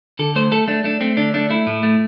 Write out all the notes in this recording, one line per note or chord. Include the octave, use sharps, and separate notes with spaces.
D3 A4
A3 C5
A3 A4
A3 D4
A3 D4
A3 C4
D3 D4
A3 D4
A3 E4
A2
A3